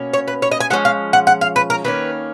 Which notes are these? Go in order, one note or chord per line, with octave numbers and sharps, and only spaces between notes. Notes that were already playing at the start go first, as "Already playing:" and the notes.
Already playing: B2 A#3 C#4
C#5
B4
C#5
D#5
G#5
F3 G#3 C#4 F#5
F5
F#5
F#5
F5
B4
A#4
D#3 A#3 C#4 B4